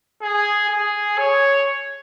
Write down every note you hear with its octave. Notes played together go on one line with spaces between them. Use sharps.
G#4
G#4
C#5